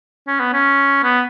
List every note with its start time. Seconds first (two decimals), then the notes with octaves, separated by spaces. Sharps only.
0.28 C#4
0.40 B3
0.53 C#4
1.03 B3